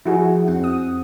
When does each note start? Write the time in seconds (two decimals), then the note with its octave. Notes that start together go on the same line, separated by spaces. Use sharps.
0.06 F3 E4 F#4 G#4
0.48 F2 C4 F#5
0.64 D#6